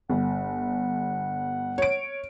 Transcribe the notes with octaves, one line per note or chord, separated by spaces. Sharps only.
G1 F#5
C#5 D7